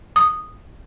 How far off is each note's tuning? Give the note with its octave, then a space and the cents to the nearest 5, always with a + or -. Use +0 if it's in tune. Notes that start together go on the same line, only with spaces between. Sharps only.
D#6 -10